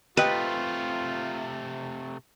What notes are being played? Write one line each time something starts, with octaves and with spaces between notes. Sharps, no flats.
C3 A3 F4 G4 B4 D#5 G5